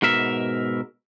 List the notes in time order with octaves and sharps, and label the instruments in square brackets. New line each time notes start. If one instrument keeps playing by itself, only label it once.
[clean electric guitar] G#2 B2 A#4 E5